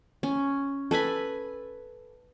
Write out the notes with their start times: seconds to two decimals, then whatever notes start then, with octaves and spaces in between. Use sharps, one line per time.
0.23 C#4
0.91 A4 B4 G#5 B5